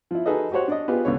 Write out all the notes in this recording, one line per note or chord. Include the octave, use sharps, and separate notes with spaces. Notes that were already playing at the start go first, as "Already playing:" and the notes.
F3 E4
D#4 F#4 G#4 A4 B4 D#5
F#4 G4 C5 C#5 F#5
D4 D5 D#5
B3 F4 G4 G#4 B4
C#2 D3 B3 C#5